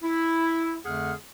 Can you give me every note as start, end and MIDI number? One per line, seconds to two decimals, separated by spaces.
0.03 0.76 64
0.85 1.13 41
0.85 1.13 50
0.85 1.13 57
0.85 1.13 68
0.85 1.13 78
0.85 1.13 89